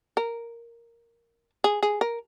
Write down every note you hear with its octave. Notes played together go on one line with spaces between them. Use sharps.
A#4
G#4
G#4
A#4